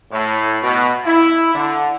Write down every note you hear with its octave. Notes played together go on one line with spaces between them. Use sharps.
A2
B2
E4
D3